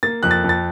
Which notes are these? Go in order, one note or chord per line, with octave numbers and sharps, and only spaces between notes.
A#3 A6
F2 F#6
A6
F2
A6